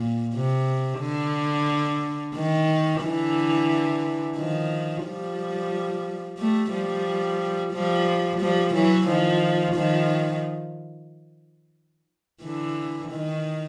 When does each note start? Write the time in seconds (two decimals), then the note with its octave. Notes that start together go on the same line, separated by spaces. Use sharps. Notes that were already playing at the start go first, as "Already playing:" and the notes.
Already playing: A#2
0.34 C3
1.00 D3
2.35 D#3
3.03 D3 E3
4.37 D#3 F3
5.05 F3 G3
6.38 G3 A3
6.72 F3 G3
7.73 F3 G3
8.40 F3 G3
8.74 E3 F#3
9.07 D#3 F3
9.75 D#3 F3
12.43 D3 E3
13.11 D#3